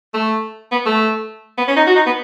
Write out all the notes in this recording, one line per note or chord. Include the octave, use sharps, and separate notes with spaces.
A3
B3
A3
B3
C#4
D#4
F#4
D#4
B3